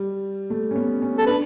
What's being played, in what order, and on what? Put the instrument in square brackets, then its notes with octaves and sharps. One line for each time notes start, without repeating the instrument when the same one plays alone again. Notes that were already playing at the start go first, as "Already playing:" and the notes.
Already playing: [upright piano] G3
A3
C#4
B3
C#4
[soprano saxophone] A4
[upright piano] D4 [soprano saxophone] B4